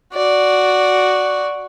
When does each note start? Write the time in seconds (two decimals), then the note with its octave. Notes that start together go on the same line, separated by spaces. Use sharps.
0.14 F#4 D5